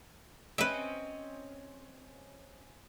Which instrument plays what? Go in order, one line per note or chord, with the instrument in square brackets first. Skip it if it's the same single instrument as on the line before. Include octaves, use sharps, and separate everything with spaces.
[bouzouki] C4 C#4 D#5 [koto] B4 E5